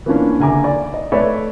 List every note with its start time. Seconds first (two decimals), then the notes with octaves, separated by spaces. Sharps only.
0.06 E3 F3 A#3 B3 C#4 D4
0.39 F#1 D3 E5 G#5 A#5 D6
0.64 D5
0.94 D#5
1.12 A3 B4 C#5 D5 E5